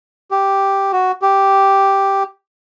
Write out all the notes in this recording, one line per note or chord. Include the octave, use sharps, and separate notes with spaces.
G4
F#4
G4